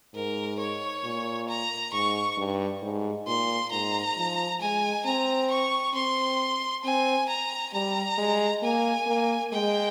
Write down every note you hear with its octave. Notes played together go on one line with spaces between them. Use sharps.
G#2 A#4
C#5
A#2
A#5
G#2 C#6
G2
G#2
A#2 C6
G#2 A#5
F3
G#3 G#5
C4 A#5
C#6
C4 C6
C4 G#5
A#5
G3 A#5
G#3
A#3 G#5
A#3
G#3 G5